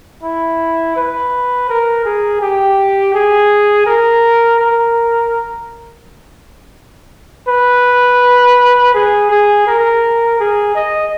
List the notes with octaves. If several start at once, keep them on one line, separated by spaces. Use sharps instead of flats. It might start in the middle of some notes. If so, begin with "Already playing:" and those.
E4
B4
A#4
G#4
G4
G#4
A#4
A#4
B4
G#4
G#4
A#4
G#4
D#5